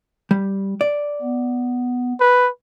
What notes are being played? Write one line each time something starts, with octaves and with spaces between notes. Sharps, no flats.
G3
D5
B3
B4